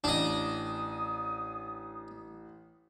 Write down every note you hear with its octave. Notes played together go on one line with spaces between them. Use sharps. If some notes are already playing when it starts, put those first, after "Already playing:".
A1 D4 D#5
D#6